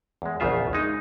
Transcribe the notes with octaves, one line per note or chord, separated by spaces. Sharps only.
E2 G#3
A#1 E2 C#3 F4 E5
G#3 D#4